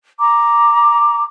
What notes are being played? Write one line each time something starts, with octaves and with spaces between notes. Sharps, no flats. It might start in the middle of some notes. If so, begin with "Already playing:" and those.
A#5 D6